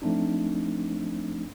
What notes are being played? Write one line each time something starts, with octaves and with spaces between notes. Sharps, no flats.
F3 A3 C4 D4 D#4